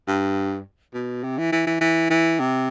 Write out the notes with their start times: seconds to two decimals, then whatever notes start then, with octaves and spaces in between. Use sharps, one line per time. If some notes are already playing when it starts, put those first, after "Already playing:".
0.08 G2
0.94 B2
1.23 C3
1.38 E3
1.52 E3
1.67 E3
1.81 E3
2.10 E3
2.39 C3